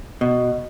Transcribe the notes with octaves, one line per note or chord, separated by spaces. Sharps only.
B2